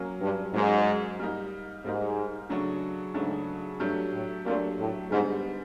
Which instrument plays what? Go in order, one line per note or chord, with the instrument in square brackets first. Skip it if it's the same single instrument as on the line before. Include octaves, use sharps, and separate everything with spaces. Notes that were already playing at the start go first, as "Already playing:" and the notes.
Already playing: [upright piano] F#3 A#3 C#4
[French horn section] G2
[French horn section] G#2 [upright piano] F#3 A#3 C#4
[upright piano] G3 A#3 D#4
[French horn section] G#2 [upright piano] G3 A#3 D#4
[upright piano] C#3 F#3 A3 D4 F#4
[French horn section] G#2 [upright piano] C#3 F#3 A3 D4 F#4
[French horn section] G2 [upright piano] F#3 A3 D4 G4
[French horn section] A2
[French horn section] A#2 [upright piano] F#3 A3 D4 G4
[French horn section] A2
[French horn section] G#2 [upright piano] D3 G3 B3